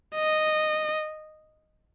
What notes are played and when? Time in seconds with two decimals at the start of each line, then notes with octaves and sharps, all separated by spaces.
0.16 D#5